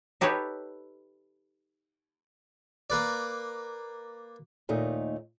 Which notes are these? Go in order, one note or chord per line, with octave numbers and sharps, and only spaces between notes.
D#4 G4 A4 B4 C#5
A#3 B4 D5
D#2 A#2 A3 D#4